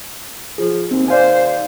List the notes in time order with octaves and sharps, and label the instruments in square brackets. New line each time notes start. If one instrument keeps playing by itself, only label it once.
[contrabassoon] F3 [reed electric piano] G#4
[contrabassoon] D#2 [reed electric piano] C4
[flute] C5 [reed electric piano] D5 F5 G#5